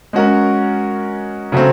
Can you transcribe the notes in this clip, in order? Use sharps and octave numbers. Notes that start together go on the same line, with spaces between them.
G#3 C#4 F#4 A#4
C#3 F#3 A3 C4